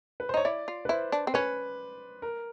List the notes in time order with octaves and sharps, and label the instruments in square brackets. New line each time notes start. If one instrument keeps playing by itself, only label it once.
[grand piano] B4
C5
[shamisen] D#4 [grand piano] C#5
[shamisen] E4 [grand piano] D5
[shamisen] F4
[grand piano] B4
[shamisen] E4 [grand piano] C5
[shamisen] D4
C4
[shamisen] C#4 [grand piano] B4
[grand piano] A#4